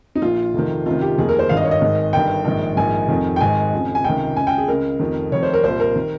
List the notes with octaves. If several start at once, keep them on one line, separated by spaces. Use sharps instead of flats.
D#4
A#1 A#2 F4
F1 F2 C3 D#3
C#2 C3 D#3 F4
G4
F1 D#2 D#3 G#4
A#4
C5
G#1 G2 D#3 F5
D#5
C#5
D#5
G#1 G#2 D#3
G1 G2 D#3 G5
A#1 G#2 D#3
A#1 G#2 D#3 G#5
F1 F2 D#3
G5
G#1 G#2 D#3 G#5
F1 F2 C#3
G#5
C#2 C3 D#3 G5
C#2 C#3 G#5
G5
G#4
C#2 C#3 A#4
F1 F2 D#3
F1 F2 D#3 C#5
C5
A#4
C2 A#2 C5
A#4
D#3